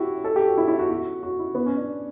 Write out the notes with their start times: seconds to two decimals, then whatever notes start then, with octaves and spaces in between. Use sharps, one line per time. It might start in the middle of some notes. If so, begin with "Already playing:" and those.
Already playing: E4 F#4 G4
0.24 A4
0.36 G4
0.47 F#4
0.57 E4
0.68 E4
0.79 F#4
0.91 F#4
1.23 F#4
1.39 E4
1.55 B3
1.66 C#4
1.77 D4